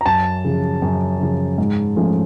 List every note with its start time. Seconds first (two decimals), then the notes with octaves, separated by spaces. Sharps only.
0.01 A#5
0.06 F#2 A5
0.45 C#3 F3
0.82 F#2
1.20 C#3 F3
1.58 G#2
1.96 F3 A3 C#4